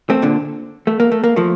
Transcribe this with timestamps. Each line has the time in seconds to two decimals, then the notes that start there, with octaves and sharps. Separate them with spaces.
0.10 A3 C4
0.22 A#2 D3
0.87 A3
1.00 A#3
1.12 A3
1.24 A#3
1.36 F3 A3